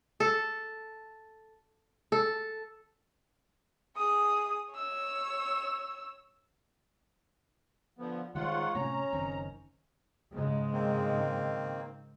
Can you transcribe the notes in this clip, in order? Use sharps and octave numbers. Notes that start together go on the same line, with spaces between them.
A4
A4
G#4 D#6
C#5 E6
D3 F3 B3
G#2 D#3 G3 F4 C#5 F#5
A2 C3 G3 C#4 A#5
F#1 D#3 C4
G#2 C#3 G#3
D#3 A#3 C4